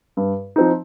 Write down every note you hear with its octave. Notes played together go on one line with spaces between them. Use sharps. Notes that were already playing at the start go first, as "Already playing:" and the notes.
G2
F3 C4 D#4